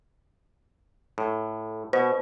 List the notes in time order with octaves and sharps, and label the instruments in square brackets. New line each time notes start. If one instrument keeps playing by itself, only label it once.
[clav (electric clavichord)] A2
[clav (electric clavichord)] B2 [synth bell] C5